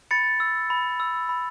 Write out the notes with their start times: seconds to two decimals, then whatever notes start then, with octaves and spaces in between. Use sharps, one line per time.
0.11 B5 A6 C#7
0.40 E6
0.70 B5
1.00 E6
1.29 B5